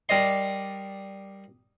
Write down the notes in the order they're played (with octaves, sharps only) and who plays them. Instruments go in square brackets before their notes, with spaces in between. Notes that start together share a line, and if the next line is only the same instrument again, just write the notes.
[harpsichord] G3 A#4 D5 D#5 C6